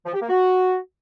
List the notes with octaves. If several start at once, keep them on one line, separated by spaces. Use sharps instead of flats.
F3
G4
A#3
F#4